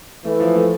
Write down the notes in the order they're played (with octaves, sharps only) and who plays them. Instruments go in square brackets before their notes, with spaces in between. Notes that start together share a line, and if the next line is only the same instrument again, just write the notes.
[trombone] E3 [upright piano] A3
[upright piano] F3
A3